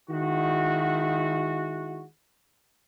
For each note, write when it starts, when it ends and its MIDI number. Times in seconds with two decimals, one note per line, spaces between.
0.10 2.05 51
0.10 2.05 56
0.10 2.05 64
0.10 2.05 66